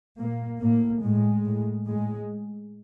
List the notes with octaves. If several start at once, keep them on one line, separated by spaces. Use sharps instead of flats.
A#2 A#3
A2 A#3
A2 G#3
A2
A2 G#3